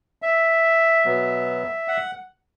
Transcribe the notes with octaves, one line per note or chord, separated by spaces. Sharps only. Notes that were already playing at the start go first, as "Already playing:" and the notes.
E5
B2 F#3 B3
F#5